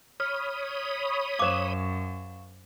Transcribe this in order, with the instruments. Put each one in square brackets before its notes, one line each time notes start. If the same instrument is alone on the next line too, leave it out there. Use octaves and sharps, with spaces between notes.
[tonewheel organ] C#5 B5 D#6 [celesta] F6
[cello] F#2 [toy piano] C5 D6 [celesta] F5 C#6 E7